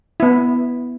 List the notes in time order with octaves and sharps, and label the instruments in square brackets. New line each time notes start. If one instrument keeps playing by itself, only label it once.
[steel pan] B3 E4